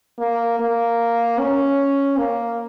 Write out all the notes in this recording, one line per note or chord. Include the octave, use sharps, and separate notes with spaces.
A#3
A#3
C#4
A#3